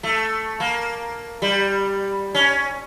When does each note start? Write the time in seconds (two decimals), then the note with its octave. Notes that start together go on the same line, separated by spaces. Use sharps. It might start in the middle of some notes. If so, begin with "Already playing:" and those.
0.03 A3
0.60 A#3
1.42 G3
2.34 C#4